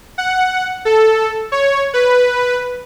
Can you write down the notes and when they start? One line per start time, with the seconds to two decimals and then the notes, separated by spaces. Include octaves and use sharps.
0.18 F#5
0.85 A4
1.52 C#5
1.94 B4